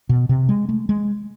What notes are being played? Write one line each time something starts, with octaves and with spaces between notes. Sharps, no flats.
B2
C3
G#3
A3
G#3